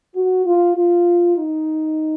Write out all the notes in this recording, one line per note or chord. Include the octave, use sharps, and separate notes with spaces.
F#4
F4
F4
D#4